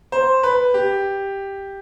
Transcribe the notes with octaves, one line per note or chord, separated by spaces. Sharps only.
C5
B4
G4